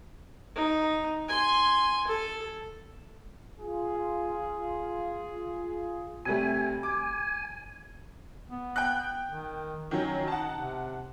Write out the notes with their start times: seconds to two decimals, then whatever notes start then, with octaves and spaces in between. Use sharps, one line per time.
0.56 D#4
1.29 G#5 C6
2.08 A4
3.60 F4 G#4
6.25 C3 G3 A3 G#5
6.83 G#5 D6
8.49 B3
8.76 G5 F#6
9.29 D#3
9.91 D#3 F#3 C#4
10.28 D#4 F#5 A5
10.58 C3